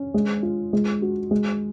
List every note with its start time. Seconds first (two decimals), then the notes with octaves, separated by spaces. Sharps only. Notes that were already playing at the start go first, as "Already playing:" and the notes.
Already playing: C#4
0.14 G#3
0.43 F4
0.73 G#3
1.02 F#4
1.31 G#3